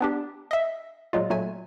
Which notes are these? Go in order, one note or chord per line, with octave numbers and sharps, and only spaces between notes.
B3 D4 G4
D#5 E5
A#2 F#3 G#3 F4
A#2 F#3 A3 G#5